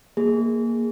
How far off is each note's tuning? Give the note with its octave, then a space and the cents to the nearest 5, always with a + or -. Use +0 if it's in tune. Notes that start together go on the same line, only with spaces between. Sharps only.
A#3 +0 G#4 +0